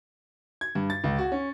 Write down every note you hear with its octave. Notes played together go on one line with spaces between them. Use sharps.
G#6
G2
A6
C#2
F#4
C#4